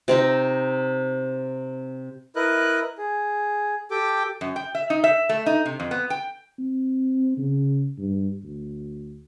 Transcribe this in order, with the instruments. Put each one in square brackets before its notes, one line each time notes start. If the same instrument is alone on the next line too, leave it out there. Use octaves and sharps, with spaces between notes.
[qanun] C3 C4 D#4
[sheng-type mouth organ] E4 A#4 B4 D#5 F#6
G#4
G4 A4 G5 D6
[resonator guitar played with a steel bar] F#2
G5
E5
D#4
E5
A3
D#4
C3
F2
B3
G5
[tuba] C4
C#3
G2
D2